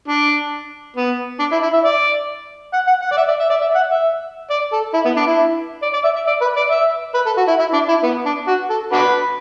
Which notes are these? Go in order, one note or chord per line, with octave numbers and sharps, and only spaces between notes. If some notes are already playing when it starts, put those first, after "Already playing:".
D4
B3
D4
E4
E4
E5
D5
F#5
F#5
F#5
D5
E5
D5
E5
D5
E5
F#5
E5
D5
A4
E4
B3
D4
E4
D5
D5
E5
E5
D5
B4
D5
E5
B4
A4
F#4
E4
E4
D4
E4
B3
D4
F#4
A4
D4 F#4 B4